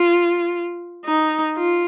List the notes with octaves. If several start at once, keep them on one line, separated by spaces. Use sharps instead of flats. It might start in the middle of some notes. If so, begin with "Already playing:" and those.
Already playing: F4
D#4
F4